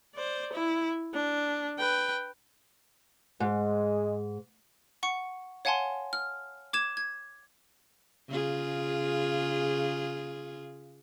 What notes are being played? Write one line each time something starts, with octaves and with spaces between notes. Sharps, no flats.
C5 D5
E4
D4
B4 G5
G#2 G#3
F#5 C#6 C#7
C#5 F5 F#5 G#5 A5 C6
F6
D6 G#6 E7
G#6
C#3 F4 G#4